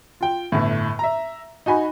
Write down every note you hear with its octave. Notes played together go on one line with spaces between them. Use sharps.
F4 G5
G1 A2
E5 A#5
D#4 F#4 G#5 B5